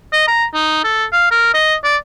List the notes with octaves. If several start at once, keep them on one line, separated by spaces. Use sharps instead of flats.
D#5
A#5
D#4
A4
F5
A#4
D#5
D5